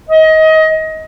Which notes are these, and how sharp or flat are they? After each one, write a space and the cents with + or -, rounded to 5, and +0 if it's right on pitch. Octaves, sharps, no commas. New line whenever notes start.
D#5 +25